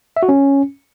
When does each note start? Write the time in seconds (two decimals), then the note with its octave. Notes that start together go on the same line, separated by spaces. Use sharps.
0.17 E5
0.23 F#4
0.29 C#4